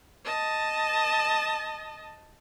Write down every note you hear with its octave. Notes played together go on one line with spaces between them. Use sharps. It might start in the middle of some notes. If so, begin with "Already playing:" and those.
D#5 A5